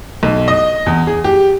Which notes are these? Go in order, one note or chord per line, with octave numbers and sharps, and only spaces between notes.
B1
D#5
E2
G#4
G4